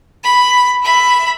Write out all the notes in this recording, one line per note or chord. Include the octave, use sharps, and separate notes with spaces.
B5
E5 B5